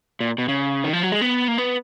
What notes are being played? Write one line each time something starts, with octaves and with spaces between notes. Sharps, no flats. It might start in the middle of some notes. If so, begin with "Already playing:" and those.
A#2
B2
C#3
D#3
F3
F#3
G#3
B3
A#3
B3